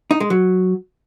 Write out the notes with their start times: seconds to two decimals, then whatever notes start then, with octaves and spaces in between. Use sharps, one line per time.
0.11 D#4
0.20 G#3
0.30 F#3